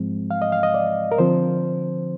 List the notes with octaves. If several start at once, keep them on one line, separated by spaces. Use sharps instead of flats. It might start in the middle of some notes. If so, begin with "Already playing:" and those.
Already playing: G#2 F3 G#3 C4
F5
D#5
F5
D#5
D5
A#4
D3 F3 C4 C5